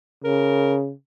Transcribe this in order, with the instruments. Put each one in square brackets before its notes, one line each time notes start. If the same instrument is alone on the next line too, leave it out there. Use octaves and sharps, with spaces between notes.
[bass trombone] C#3 [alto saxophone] A#4